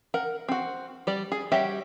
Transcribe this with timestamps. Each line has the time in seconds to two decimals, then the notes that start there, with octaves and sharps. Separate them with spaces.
0.14 A#4 F#5
0.49 C4 F#4
1.07 G3 D5
1.32 G#4
1.52 G3 F#4 G4 C#5 E5